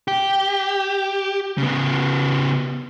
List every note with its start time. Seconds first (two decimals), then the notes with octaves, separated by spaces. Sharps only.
0.08 G4
1.58 C#3 B3